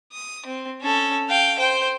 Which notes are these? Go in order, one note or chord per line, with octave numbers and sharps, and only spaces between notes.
D#6
C4
C#4 A4
F5 G5
C5 G5